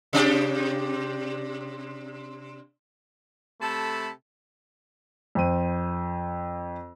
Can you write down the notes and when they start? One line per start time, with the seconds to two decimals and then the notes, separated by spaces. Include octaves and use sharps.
0.13 C3 D4 G4
3.61 C3 A3 A4 A5 B5
5.35 F2 C5 D#7